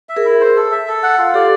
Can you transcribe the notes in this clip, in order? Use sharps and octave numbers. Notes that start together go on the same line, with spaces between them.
E5
G#4 A#4
E4
C5
A4
E5
A4
F#5
F4
G4 A4 D5